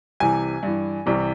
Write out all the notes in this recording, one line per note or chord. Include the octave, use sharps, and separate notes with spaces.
C2 C3 E3 G#5
G2 E3
C2 C3 E3